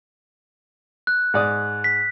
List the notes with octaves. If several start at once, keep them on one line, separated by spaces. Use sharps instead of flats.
F#6
G#2 D5 D#6
B6